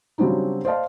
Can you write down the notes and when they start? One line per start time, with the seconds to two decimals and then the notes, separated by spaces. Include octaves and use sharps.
0.18 C#3 F#3 G3 C4 D4 D#4
0.65 C5 D5 D#5 F5 A5